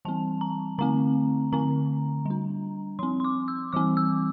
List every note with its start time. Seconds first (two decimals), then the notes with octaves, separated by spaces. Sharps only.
0.05 E3 G3 C4 A5
0.41 A#5
0.78 D3 A3 C4 A#5
1.52 D3 A3 C4 A#5
2.26 G3 D4
2.99 F3 C4 C6
3.20 C6
3.24 D6
3.48 E6
3.73 E3 G3 C4 D6
3.97 E6